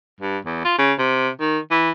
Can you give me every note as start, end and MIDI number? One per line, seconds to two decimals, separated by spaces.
0.20 0.38 43
0.45 0.61 40
0.65 0.77 65
0.78 0.93 49
0.98 1.29 48
1.40 1.59 51
1.71 1.90 52